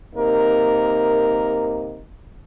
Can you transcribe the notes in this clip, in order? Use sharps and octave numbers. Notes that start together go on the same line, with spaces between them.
C3 A#3 D#4 A#4